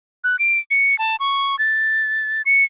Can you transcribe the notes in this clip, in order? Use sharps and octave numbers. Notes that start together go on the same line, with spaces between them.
F#6
D7
C#7
A5
C#6
A6
C#7